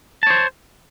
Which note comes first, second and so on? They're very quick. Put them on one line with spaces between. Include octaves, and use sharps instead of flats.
A5 C#5 C5